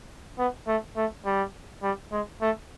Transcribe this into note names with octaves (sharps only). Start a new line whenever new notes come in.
B3
A3
A3
G3
G3
G#3
A3